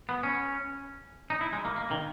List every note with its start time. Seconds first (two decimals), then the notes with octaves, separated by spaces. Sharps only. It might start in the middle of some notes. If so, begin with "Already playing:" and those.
0.09 B3
0.23 C#4
1.30 D#4
1.41 E4
1.53 G#3
1.65 A#3
1.76 A#3
1.91 D#3